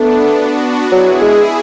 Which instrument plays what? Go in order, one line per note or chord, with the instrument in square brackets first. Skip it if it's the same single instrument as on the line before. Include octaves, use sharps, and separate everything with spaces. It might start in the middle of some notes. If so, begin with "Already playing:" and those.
Already playing: [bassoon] A3 [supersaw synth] B3 D4
[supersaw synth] D4 F#4
[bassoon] F#3 [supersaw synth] E4 G#4
[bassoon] G#3